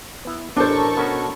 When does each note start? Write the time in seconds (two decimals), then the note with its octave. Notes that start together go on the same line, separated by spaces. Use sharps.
0.25 B3 E4
0.56 A1 D4 A4 A#4 C5 C#6
0.97 B2 C#4 F#4